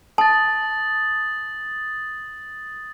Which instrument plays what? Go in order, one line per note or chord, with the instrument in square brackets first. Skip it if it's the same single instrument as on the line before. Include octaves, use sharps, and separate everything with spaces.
[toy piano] A5 [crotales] D#6 A6